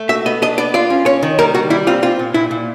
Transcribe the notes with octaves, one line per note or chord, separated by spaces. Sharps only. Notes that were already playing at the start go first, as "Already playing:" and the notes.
Already playing: A3
F#4 E5
B3 D#5
D4 D#5
B3 D5
F4 D5
C#4
C#4 C#5
D#3
G3 A#4
G3 F#4
G3 E4
C4 F4
C4 F4
A#2
A#2 E4
A#2